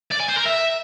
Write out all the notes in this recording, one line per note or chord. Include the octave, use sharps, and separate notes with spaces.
D5
G#5
C5
A#4
E5